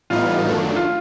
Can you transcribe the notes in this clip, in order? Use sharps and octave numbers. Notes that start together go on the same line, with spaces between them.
A2 E3 G3 B3 D#4 F4
F#2 D#3 F#3 A3 D4
F4